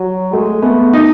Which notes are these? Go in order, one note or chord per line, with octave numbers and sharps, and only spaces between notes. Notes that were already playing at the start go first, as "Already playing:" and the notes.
Already playing: F#3
G#3 A3
A3 B3
D#4